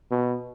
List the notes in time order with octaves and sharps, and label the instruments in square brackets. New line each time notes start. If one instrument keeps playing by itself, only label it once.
[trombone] B2